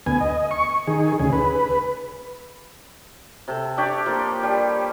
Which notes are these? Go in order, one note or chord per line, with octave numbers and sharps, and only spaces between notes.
D2 B3 G#5
D#5
C#6
D#3 G#4
D2 C#3 G#4
B4
C3 A4
D4 G4 C#5 D5
F3 A#3
G3